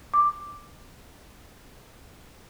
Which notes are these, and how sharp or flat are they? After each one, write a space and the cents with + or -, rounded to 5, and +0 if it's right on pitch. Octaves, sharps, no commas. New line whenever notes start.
D6 +5